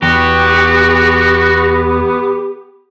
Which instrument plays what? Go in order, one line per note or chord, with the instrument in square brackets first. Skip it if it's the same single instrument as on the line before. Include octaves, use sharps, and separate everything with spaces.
[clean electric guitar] E2 [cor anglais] B3 [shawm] F#4 [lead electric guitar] G4